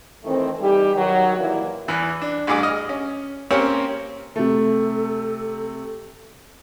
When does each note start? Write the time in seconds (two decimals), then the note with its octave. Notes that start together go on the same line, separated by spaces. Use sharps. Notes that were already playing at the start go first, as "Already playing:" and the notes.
0.24 D#3 E3 A3 C4
0.59 E3 G3 D#4 G4
0.94 D#3 F#3
1.38 A#2 E3 G3 A#3 E4
1.88 E2 E3
2.22 D4
2.47 A1 G2 G#4 D6
2.63 D#5 F6
2.89 C#4
3.51 A#3 C4 C#4 G4 A#4 C#5
4.36 C3 A3 A4